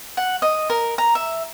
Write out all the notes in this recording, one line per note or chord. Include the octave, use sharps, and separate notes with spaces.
F#5
D#5
A#4
A#5
E5